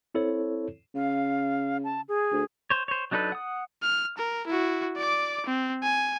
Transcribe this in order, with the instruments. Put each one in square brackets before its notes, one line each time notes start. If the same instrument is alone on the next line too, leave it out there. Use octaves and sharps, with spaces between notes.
[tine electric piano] C4 E4 A4 C5 C#5
[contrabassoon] C#3 [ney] F5
[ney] A5
G#4
[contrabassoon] D2
[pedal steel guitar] C5 C#5
C5 C#5
F#3 D4 D#4 A4 B4
F#5 D#6
[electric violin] F6
A#4
E4 F#4
D5 D6
C4
G#5